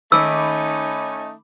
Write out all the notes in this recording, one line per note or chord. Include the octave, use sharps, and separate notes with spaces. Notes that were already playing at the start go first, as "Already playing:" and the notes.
D#3 A3 C#4 D#4 B5 D6 E6